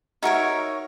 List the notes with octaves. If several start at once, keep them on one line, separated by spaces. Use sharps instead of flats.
D#4 F#4 A#4 C#5 E5